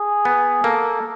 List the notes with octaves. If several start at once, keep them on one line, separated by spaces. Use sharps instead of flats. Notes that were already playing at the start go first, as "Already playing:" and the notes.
Already playing: G#4
B3
A#3 A4